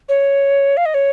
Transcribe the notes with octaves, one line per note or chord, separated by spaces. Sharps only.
C#5
F5
D#5
C#5